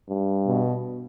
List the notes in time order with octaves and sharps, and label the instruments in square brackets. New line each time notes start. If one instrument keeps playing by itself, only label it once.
[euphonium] G2
[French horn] B2